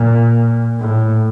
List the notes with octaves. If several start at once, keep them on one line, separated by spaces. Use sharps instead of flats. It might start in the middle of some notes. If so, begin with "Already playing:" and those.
Already playing: A#2
A2